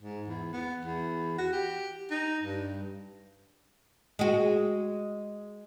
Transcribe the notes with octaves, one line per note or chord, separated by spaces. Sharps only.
G#2
E2
B3
E2
F#4
G4
D#4
G2
G#3 F#4